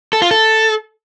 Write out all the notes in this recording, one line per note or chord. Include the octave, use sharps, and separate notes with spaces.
A4
F4
A4